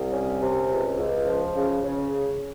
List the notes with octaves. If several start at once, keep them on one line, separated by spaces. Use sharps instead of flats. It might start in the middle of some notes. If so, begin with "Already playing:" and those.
Already playing: C2
C#4
C3
C#2
C#2
F3
C#3
C#3